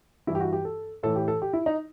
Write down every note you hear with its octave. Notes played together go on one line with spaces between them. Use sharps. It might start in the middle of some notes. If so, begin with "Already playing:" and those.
G2 E3 E4
G4
F#4
G4
A4
A2 E3 A4
G4
A4
G4
E4
D#4